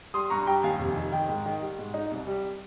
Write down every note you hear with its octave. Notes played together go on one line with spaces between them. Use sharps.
G3 C6 D#6
G2 A#5 C#6
G3 G5 A#5
D#2 F5 G#5
F1
D#3
D#3 G5
G#2
D#3
G3
G#2
D#4
C2
G3